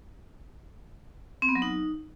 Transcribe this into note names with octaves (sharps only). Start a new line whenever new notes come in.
C4
B3
F#3
D#4